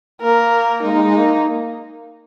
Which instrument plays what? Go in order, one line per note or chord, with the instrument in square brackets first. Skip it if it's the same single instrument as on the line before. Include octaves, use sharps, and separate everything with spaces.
[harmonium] A#3 [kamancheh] A#4
[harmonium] G#3 [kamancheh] D#4
[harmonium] G#3
G#3
A#3